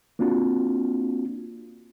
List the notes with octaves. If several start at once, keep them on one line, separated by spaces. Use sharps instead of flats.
A#3 C4 D4 F4 F#4